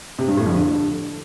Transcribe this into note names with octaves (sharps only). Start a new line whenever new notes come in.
C3
G2
A2
F2
D3